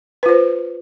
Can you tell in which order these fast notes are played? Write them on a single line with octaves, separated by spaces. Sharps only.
B4 F4 C5